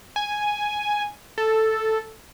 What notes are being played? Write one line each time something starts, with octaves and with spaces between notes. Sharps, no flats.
G#5
A4